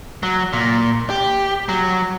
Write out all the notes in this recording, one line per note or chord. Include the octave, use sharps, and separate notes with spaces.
F#3
A#2
G4
F#3